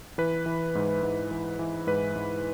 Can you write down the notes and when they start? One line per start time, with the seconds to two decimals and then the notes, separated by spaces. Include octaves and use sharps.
0.18 E3 B4
0.46 E3
0.75 G#2
1.03 G#2
1.31 E3
1.59 E3
1.87 G#2 B4
2.16 G#2